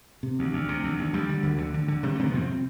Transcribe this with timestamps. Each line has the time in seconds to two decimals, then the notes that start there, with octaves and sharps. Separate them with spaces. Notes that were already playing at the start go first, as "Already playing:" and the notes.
0.23 C3
0.39 D2
0.53 D2
0.69 C3
0.83 D2
0.98 D2
1.13 D2 G3
1.29 D3
1.43 D2
1.58 D3
1.74 D3
1.88 D3
2.03 C3 G3
2.16 A3
2.19 C3
2.27 B3
2.34 F2 C4